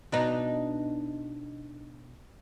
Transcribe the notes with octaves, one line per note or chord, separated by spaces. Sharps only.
B2 D4 D#4 B4 A#5